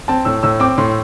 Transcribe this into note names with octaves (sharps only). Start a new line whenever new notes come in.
C4 A5
A2 E6
A2 E6
C4 D6
A2 C6